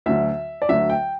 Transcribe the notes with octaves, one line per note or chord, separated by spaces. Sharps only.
D2 D3 F#3 E5
D5
D2 D3 F#3 E5
G5